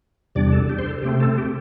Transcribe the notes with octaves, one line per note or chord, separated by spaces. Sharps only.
E2 C3 G3 D4 D5
A4
G4
C5
A4
C3 A3 C4 G4
A4
G4